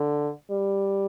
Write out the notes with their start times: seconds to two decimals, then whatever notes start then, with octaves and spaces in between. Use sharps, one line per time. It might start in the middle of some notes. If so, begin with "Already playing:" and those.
Already playing: D3
0.51 G3